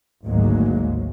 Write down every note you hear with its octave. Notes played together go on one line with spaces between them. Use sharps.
G#1 D2 F#3 G#3 A#3